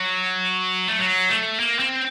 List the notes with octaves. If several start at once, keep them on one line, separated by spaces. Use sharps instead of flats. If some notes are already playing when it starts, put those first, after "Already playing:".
Already playing: F#3
A3
F#3
A3
A#3
C4